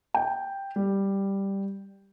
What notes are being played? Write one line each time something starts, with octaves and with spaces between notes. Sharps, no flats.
G5
G3